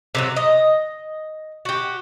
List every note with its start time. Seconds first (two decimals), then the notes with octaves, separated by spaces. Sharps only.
0.15 C3 D#3 F#3
0.36 D#5
1.65 F#4 G4